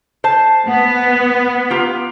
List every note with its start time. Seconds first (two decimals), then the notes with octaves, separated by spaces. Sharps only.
0.24 C5 A5
0.69 B3
1.70 A#3 F4 G4